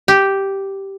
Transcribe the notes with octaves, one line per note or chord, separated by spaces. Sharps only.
G4